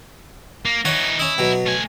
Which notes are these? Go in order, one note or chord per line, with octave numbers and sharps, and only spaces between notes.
A#3
E3 D#4 C#5 F#5
C#4 E4 D#5
B2 F#3
A3 G#5